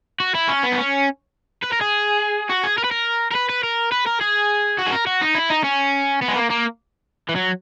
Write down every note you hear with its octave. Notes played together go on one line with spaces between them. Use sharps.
F#4
E4
C#4
B3
D#4
C#4
B4
A#4
G#4
F#4
G#4
A#4
B4
A#4
A#4
B4
B4
A#4
B4
A#4
G#4
F#4
G#4
A#4
F#4
D#4
E4
D#4
C#4
B3
G#3
A#3
A#3
E3
F#3